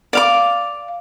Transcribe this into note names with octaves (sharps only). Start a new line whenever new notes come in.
D5 F5 D6